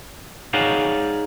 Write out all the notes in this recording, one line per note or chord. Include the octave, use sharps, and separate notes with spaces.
D#4 G#4 C#5 D5 F5 F#5